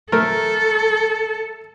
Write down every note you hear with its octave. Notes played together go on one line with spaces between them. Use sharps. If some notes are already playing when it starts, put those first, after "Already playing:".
A3 A4 A#4